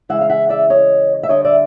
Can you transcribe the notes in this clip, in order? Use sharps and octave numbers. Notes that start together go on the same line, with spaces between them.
C#3 E3 G#3 E5 F#5
F5
E5 F#5
D5 E5
C#5 D#5
E5
D3 G3 C#5 D#5
D5 E5